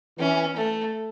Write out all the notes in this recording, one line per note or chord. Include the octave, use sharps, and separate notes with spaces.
E3 C#4
A3